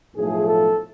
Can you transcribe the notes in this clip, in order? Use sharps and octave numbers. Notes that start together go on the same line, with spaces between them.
B1 A2 F3 A3 G#4
A4